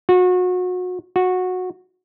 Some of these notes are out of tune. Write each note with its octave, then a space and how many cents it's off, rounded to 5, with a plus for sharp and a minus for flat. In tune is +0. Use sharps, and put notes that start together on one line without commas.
F#4 -30
F#4 -15